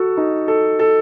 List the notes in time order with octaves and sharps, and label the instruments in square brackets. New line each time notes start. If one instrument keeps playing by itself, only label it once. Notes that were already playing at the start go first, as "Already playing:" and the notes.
Already playing: [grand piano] F#4 A4
D#4
A4
A4